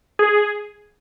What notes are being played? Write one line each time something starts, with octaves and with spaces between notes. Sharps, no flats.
G#4